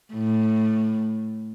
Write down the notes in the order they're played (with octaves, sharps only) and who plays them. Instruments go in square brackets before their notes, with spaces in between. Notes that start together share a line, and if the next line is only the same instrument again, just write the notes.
[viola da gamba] A2